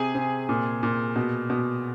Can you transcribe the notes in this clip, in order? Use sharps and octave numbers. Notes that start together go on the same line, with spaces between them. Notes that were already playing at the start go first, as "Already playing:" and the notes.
Already playing: C3 G#4 G#5
C3
A#2
A#2
B2
B2